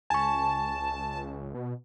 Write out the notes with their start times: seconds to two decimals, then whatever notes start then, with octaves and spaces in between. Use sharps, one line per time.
0.10 C#2 G#5 A5 C#6
1.54 B2